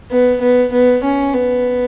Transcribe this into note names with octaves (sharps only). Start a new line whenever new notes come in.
B3
B3
B3
C#4
B3